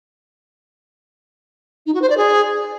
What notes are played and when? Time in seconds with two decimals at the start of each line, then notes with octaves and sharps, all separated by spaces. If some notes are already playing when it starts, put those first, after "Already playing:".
1.86 D#4
1.94 F#4
2.02 C5
2.10 D5
2.17 G#4